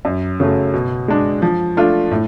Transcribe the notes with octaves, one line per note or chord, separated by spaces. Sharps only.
F#2
C#3 F#3 A3
B2
G#3 D4
F3
A3 D4 F4
A2